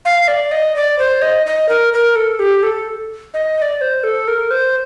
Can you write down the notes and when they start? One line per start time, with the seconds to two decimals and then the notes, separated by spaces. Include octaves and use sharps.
0.05 F5
0.28 D5
0.51 D#5
0.76 D5
0.99 C5
1.22 D#5
1.46 D#5
1.69 A#4
1.93 A#4
2.16 A4
2.39 G4
2.63 A4
3.34 D#5
3.58 D#5
3.62 D5
3.81 C5
4.04 A4
4.28 A#4
4.51 C5